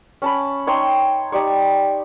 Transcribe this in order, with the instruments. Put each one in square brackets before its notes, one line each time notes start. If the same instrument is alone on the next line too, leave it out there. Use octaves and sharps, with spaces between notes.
[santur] C#4 A5 B5
D#4 C#5 G5 C6
D#4 G4 D5 C#6